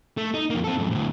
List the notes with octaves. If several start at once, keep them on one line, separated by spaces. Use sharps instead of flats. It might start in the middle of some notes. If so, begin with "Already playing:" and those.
A3
D#4
F2 A#3
C4 A4
F2 G#2
D2 A2